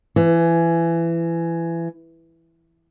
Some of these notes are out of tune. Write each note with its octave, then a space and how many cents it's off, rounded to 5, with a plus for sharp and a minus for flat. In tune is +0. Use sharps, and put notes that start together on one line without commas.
E3 +25